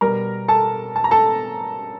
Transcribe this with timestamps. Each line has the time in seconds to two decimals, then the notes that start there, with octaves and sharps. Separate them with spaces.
0.01 B2 G3 A#4 A#5
0.48 A4 A5
0.96 A5
1.04 A#5
1.11 A4 A5